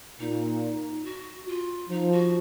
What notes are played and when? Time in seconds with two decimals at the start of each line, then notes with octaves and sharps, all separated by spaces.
0.19 A#2 D#4
1.05 F#4
1.48 F4
1.90 F3 D#4
2.12 F#4